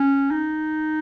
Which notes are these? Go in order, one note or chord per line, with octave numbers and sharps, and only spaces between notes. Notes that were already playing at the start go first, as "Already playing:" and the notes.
Already playing: C#4
D#4